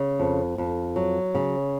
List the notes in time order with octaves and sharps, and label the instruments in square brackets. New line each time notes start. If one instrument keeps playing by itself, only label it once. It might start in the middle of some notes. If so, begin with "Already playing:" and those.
Already playing: [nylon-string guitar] C#3
F2
F2
F#3
C#3